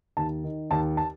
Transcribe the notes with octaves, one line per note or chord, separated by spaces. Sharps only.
D#2 A5
D#3
D#2 A5
A5